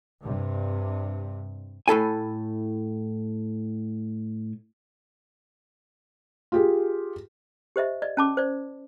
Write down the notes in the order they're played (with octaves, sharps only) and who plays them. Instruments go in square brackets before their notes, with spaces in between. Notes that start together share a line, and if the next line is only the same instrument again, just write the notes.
[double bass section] G2 C3
[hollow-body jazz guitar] A2 E4 A4 G#5
[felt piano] F4 G4 G#4
[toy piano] G4 C5 D#5 E5
D5 D#5
C#4 A5 D6
C5 D5